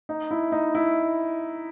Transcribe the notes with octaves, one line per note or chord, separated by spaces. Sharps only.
D#4
E4
D#4
E4